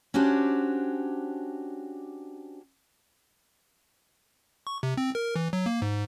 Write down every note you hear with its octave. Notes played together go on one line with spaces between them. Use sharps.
C#4 D4 F#4 G4 C5 C#5
C#6
C3
C4
A#4
E3
F#3
A#3
G#2